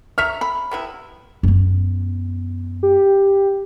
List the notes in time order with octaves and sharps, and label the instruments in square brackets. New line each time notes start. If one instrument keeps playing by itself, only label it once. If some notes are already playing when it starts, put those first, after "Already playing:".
[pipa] C#5 E5 A#5 [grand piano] F6
[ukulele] B5
[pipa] C3 B3 E4
[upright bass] F#2 B3
[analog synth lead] G4